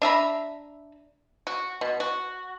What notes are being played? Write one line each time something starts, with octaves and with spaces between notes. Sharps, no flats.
D4 E5 A#5 B5
F#4
B2
F#4